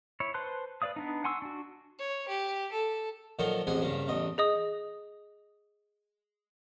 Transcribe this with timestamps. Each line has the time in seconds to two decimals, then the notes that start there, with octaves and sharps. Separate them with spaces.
0.20 E4 C#5
0.34 B4 C5 A5 C6 F#6
0.82 B4 C#5 D5 F5 D#6
0.96 B3 D4 D#4
1.24 F#5 G#5 C6 C#6 E6
1.42 D4 F#4
1.99 C#5
2.28 G4
2.72 A4
3.39 A#2 D#3 F3 F#3 A4 C6
3.67 A1 F2 G#3 G#4 F#5 G#5
3.82 G2 C#3 A#3
4.08 A1 E2 D#5
4.38 G#4 D#5 D#6